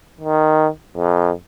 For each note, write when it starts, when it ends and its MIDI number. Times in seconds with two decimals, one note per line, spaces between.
0.20 0.68 51
0.97 1.32 41